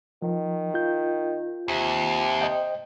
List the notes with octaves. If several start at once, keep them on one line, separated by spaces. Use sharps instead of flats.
D#3 F3
F4 G6
D#2 C3
C5 D#5 G5